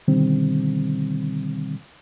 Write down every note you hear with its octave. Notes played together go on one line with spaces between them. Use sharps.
B2 D3 D#3 G3 C4